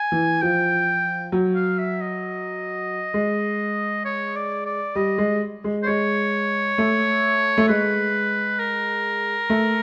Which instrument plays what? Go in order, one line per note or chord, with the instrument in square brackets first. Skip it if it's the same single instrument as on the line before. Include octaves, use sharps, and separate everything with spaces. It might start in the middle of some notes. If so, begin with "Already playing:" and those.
Already playing: [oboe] G#5
[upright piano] E3
[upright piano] F3 [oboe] G5
[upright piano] F#3
[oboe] F5
E5
D#5
[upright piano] G#3
[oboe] C#5
D5
D5
[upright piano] G3 [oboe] D#5
[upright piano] G#3
G#3
[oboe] C5
[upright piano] G#3 [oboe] C#5
[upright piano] A3
A3
[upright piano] G#3 [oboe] B4
[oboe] A#4
[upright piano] A3